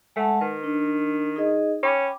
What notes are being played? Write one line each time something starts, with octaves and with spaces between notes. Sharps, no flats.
G#3 A3 F#5 A5
D#3 B4
D4
D#4 G#4 D#5
C#4 G5 B5 D6